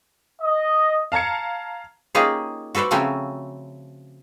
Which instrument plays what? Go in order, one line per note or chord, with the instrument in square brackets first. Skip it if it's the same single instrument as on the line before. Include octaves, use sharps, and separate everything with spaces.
[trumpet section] D#5
[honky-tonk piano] F5 A5 A#5 G#6 C#7
[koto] A#3 C#4 D#4 F4 G4 G#4
F#4 A4 B4 C5 D5
C#3 F3 F#3 A3 C4 C#4